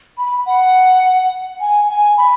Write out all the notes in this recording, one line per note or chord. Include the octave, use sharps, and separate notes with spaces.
B5
F#5
G#5
G#5
B5